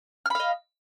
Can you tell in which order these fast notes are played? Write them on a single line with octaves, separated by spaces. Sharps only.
F6 B5 F5 D#5